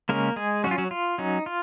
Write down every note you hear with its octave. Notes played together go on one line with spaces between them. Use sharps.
C#3 G#3 A#3 C#4 A#4
G#3 G#4
F#3 C#4 F#4
F4
F#3 F#4
F4
F#3 C#4 D#4
F4